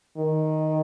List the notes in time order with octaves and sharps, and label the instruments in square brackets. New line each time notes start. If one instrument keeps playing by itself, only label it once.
[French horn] D#3